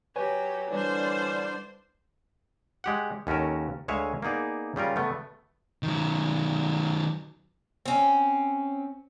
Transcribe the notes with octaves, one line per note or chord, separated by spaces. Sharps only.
F#3 G4 B4 C#5 G#5
D3 E3 G3 D4 C5
G#3 G4 F#5
D#2 C#4 F#4 A4 A#4
D2 G#3 C#5 E5 F5 G#5
A#3 B3 D#4 G#4 D5
C#3 G3 F4 A#4
A3 B3
D#3 F#3
C4 C#4